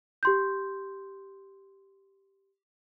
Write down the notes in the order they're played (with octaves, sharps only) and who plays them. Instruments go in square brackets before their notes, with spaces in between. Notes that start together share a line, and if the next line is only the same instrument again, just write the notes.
[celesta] G4 C6 G6